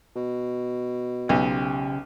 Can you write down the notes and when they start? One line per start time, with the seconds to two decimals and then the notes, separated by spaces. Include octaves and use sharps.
0.16 B2
1.29 B1 C#3 G4